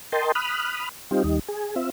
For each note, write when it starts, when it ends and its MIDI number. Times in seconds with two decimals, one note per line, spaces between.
0.12 0.32 70
0.12 0.32 75
0.12 0.32 79
0.12 0.32 81
0.12 0.32 84
0.35 0.89 83
0.35 0.89 87
0.35 0.89 89
0.35 0.89 90
1.11 1.23 55
1.11 1.23 60
1.11 1.23 63
1.11 1.23 65
1.11 1.23 67
1.24 1.39 39
1.24 1.39 55
1.24 1.39 63
1.48 1.75 68
1.76 1.90 60
1.76 1.90 65
1.76 1.90 76